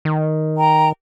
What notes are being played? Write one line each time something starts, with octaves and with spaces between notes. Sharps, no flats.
D#3
G5 A#5